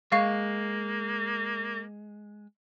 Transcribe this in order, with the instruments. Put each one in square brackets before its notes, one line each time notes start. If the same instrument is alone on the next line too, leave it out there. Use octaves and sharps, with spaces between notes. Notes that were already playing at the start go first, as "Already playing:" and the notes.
[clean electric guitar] G#3 [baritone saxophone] A#3 [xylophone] F5 C#6 C7